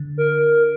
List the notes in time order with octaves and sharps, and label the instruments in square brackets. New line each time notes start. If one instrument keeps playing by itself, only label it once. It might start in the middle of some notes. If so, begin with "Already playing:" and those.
Already playing: [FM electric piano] D3
[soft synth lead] A#4